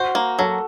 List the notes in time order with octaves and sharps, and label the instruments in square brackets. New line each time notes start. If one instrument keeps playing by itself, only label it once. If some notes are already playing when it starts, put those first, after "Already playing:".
Already playing: [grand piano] F#4 [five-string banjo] C5
[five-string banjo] A#3
[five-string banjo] F#3 [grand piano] A4